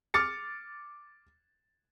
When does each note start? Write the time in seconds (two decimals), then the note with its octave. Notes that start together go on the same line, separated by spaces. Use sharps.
0.14 D6 F6 A6 C#7